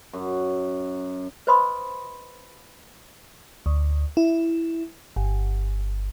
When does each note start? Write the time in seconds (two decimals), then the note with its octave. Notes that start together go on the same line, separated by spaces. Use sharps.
0.13 F#2
1.47 B4 C5 D#5 B5 C6 D#6
3.66 D2
4.17 E4
5.16 G1